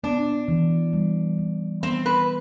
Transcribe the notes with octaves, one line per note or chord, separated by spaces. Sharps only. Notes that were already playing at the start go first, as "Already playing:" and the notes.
B3 D4
E3
G3
E3
B3 C4
B4